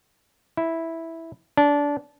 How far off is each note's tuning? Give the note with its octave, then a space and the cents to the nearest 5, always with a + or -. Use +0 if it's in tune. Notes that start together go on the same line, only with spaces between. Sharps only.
E4 -5
D4 -20